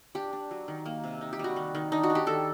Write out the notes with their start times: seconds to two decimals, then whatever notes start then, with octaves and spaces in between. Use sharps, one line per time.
0.15 D4 G4
0.33 D4
0.51 F#3
0.68 D#3
0.86 A#3
1.04 C3
1.21 D#4
1.33 G4
1.39 G3 F#4
1.56 D#3
1.75 D#3
1.92 D4 D#4
2.03 F#4
2.10 D4
2.15 G4
2.26 D#3 A4